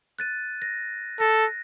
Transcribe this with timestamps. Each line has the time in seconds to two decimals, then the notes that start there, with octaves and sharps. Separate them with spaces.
0.19 F#6 A6 D#7
0.62 A#6
1.20 A4 A#6